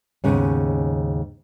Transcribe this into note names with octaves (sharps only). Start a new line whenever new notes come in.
D#2 G#2 C#3 B3 C#4